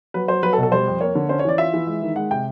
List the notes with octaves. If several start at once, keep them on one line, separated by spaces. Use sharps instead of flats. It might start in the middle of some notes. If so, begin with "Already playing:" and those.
F#3 B4
F#3 C5
F#3 B4
A4
B2
A4
G3 C5
F2
A#3 C#5
D3
C#4 C5
C#5
E3 D5
F4 E5
E3
G#3
D#3
G#3 F#5
C3 G5